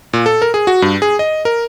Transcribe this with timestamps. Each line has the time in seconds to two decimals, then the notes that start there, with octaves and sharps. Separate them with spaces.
0.13 A#2
0.26 A4
0.42 A#4
0.54 G#4
0.67 F#4
0.82 G2
1.02 G#4
1.19 D#5
1.45 A#4